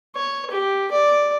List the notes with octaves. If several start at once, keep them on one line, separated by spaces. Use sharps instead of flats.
C#5
G4
D5